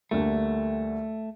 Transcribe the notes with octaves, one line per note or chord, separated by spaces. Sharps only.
D2 D3 G3 A3 A#3 D4